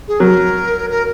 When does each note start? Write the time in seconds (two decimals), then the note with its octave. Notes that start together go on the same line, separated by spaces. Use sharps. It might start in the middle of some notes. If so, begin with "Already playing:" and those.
0.08 G#4
0.20 F#3 A#4
0.90 A#4